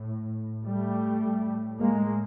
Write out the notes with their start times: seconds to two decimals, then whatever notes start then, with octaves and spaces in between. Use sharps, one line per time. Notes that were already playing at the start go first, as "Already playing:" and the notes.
Already playing: A2
0.65 G3 A3
1.23 A2
1.79 G#3 A#3